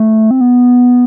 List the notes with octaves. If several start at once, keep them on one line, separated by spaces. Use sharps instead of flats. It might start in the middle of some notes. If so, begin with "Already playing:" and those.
Already playing: A3
C4
B3